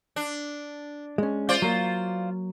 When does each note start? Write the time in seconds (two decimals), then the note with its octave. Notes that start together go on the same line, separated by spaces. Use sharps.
0.16 D4
1.18 G#3 C#4
1.49 F4 C5 D5
1.62 F#3 A#3